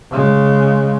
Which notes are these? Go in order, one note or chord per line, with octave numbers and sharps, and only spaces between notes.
C#3 G#3